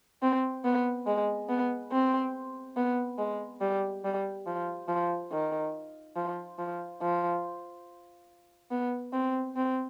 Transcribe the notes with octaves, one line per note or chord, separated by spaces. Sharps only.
C4
B3
G#3
B3
C4
B3
G#3
G3
G3
F3
F3
D#3
F3
F3
F3
B3
C4
C4